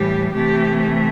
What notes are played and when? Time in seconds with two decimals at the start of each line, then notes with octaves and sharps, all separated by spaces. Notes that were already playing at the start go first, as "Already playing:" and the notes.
Already playing: A2 E3 G3 G4
0.34 C3 E3 A3 G4